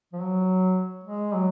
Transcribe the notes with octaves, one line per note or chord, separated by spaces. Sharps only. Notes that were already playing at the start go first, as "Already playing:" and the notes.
F3
F#3
G#3
F#3